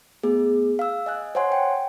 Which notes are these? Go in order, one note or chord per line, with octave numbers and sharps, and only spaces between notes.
A3 B3 G#4
F5 E6
D#5 G#5 F#6
C5 C#5 F#5 G#5 C6
G5